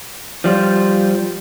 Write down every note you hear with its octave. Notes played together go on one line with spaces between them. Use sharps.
F3 G3 F4